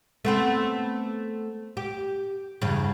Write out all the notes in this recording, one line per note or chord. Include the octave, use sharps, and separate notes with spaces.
A3 B3 C4
G4
E2 G2 C#3